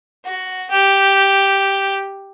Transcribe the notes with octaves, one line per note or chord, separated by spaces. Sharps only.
F#4
G4